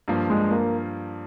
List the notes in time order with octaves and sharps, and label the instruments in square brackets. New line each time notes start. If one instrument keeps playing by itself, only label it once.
[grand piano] G2 F3 A#3 F4
[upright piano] G#3
A#3